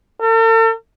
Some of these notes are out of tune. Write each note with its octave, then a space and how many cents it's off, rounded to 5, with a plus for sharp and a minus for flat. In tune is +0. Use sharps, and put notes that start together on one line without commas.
A4 +45